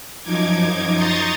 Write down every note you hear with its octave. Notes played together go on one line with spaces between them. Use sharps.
F#2 F3 D#4 D6 G#6
A#5 C6 C#6 D#6 G6 A6